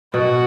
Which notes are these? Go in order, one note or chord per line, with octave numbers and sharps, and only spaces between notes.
B2 F#4